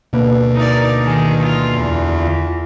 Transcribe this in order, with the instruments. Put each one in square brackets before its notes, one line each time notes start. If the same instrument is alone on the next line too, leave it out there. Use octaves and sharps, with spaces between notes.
[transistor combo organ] D2 [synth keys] B2 A#3 B4
[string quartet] D#4 A#4 D5
D#3 G#3
F4
E2
[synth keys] F4